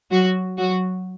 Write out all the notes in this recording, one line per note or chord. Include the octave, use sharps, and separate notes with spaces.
F#3 F#4
F#3 F#4